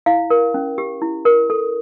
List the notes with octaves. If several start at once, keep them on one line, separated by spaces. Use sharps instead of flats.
E4 F5
A#4
C#4
G4
E4
A#4
A4